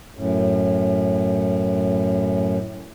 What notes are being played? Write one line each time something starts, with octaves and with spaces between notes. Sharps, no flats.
F#2 A2